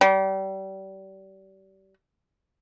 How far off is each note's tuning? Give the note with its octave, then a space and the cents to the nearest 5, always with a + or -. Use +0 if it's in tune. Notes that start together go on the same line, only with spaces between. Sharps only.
G3 -30